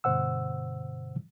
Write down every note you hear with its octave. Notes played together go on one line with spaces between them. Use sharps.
G2 B2 D3 C5 F#5 E6